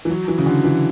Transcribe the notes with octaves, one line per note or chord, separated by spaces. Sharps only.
E3
F#3
E3
C#3
D3
E3